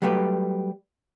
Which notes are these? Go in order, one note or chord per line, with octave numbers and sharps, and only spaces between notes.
F#3 G3 A3 G4 B4